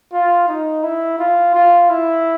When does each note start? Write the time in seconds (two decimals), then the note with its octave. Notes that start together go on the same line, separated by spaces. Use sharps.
0.13 F4
0.48 D#4
0.83 E4
1.19 F4
1.54 F4
1.90 E4